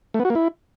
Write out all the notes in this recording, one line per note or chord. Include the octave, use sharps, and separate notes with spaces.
A3
B3
F#4
A#3
E4